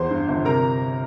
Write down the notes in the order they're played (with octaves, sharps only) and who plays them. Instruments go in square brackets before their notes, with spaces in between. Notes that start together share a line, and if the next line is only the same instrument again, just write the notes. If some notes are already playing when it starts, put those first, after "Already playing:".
Already playing: [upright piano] E2 C5 C6
G2
G1
C3 A#4 A#5